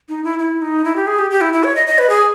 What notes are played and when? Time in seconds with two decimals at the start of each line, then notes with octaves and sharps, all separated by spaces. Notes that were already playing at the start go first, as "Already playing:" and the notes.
0.09 D#4
0.24 E4
0.39 E4
0.62 D#4
0.85 E4
0.96 G4
1.07 G#4
1.19 G4
1.31 G4
1.41 E4
1.53 E4
1.64 C#5
1.76 D#5
1.87 D#5
1.98 B4
2.10 G#4